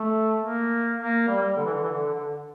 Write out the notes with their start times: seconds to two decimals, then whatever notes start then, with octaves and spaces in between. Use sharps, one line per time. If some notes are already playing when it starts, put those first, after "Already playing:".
Already playing: A3
0.42 A#3
0.99 A#3
1.28 G3
1.42 G3
1.56 D3
1.65 E3
1.74 D3
1.82 E3
1.91 D3
2.14 D3